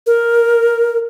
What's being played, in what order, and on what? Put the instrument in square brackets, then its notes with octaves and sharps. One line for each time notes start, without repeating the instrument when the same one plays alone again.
[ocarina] A#4